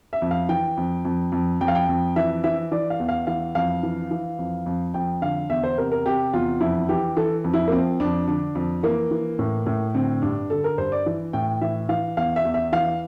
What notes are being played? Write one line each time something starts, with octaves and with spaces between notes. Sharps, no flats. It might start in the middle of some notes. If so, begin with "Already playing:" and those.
E5
F2
F5
E3 G5
F2
F2
F2
F2 G5
F5
G5
F2
E3 E5
E3 E5
E3 D5
F5
E2
F5
E3 F5
F2 F5
E3
E3
F2
F2
F2 G5
D3 F5
E2 E5
C5
C3 A#4
A#4
C3 G4
E2 F4
F2 E4
E3 G4
E3 A4
F2
E4
A#3
F3 C4
F2 D4
D3 D4
F2
E3 A#3
E3
A2
A2
D3 C4
G2 D4
D3 A4
A#4
G2 C5
D5
E3
A2 G5
E3 E5
E3 F5
E2 F5
E5
E2
E5
E3 F5